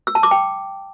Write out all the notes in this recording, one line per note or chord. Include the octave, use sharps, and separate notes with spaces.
E6
A5
D6
G5